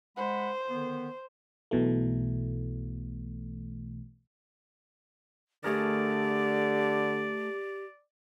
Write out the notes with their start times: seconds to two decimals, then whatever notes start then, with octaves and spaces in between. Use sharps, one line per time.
0.17 G#3 C5 F#5 B5
0.70 D3 D#3 B3
1.71 B1 B2 E3 A3
5.64 D3 A3 G4 G#4 A#4 D5